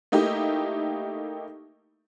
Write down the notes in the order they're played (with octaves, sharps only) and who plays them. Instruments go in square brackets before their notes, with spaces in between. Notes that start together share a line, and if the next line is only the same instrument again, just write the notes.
[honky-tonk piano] A3 A#3 D#4 E4 G4